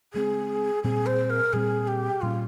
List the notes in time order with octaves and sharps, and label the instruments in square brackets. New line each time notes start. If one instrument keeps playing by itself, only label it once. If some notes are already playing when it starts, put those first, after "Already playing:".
[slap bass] C#3 G#3 C4 [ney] G#4
[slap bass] A#2 G3 C4 [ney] G#4
[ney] C5
A#4
[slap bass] A#2 G3 C4 [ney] G#4
[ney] G4
[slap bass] A#2 G3 C#4 [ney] F4